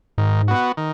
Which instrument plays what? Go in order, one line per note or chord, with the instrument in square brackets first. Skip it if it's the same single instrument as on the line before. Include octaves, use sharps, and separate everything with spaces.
[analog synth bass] G#2 [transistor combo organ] D#3
[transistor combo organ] B3 F#4
D#3